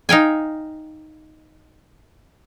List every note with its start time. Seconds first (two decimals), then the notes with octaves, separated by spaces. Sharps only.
0.09 D#4 F5 G5 G#5